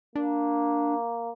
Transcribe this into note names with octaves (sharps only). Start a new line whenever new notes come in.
A#3 D4